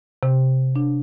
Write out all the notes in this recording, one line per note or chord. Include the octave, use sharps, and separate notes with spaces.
C3
D4